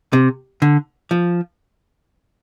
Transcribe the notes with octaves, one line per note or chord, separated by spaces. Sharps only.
C3
D3
F3